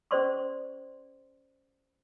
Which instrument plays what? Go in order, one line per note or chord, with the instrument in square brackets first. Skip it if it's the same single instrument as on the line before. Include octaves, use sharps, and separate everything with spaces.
[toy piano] C#4 G#4 C5 D5 C6 C#6